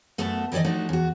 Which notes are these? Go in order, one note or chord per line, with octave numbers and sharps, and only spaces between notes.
F#2 A3 B3 F#4 A4 A5
D#3 E3 G#4 D5 D#5
A2 F3 A3 D4 D#4 F#4
E2 F#4